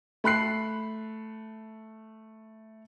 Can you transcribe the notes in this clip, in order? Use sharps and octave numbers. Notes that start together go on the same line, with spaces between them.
A3 B5 F#6 C7